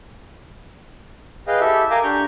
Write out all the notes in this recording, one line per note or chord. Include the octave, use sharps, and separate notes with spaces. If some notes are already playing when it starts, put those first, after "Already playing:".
G#4 B4 D#5 F5 G5
E4 G4 A4 E5
A#4 F5 G5 G#5 A#5 D6
D4 G4 A#5 C#6 G6